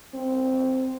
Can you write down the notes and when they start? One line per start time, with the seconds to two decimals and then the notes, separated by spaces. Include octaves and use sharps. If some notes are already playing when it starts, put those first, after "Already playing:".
0.14 C4